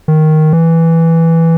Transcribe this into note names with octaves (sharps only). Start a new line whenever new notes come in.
D#3
E3